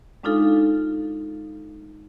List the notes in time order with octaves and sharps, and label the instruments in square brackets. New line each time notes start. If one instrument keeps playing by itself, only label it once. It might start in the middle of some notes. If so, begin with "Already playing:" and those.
[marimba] G#3 D4 D#4 F4 A4 F5